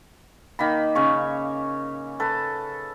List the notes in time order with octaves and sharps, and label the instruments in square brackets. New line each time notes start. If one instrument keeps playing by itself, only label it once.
[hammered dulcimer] D#3 A#3 B5
C#3 C#5 C#6
A4 B4